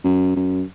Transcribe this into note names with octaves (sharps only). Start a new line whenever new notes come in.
F#2
F#2